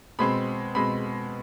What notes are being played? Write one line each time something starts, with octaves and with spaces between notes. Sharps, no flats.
B2 G#3 C4 B5
B2 G#3 C4 B5